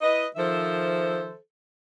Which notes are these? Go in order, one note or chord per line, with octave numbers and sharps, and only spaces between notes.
E4 B4 D#5
D#3 F3 A4 C5 E5